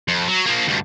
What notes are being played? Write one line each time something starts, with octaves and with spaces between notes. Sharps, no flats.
F2
F#3
F3 A#3
D2 G2